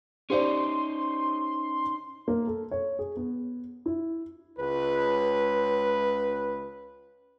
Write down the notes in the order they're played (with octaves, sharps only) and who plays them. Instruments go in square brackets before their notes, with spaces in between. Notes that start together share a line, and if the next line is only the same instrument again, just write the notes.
[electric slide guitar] C#4 D#4 [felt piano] G4 C5 D5 [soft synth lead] C6
[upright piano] A#3
A4
C#5
G#4
B3
E4
[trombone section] C#2 B4